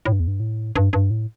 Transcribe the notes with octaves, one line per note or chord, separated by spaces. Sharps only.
A2
G2
E2
G2
A2
G2
G2
A2